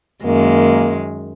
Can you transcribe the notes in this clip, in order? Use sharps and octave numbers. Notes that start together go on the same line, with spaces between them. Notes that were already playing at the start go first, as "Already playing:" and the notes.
F#2 D#3 G#3 A#3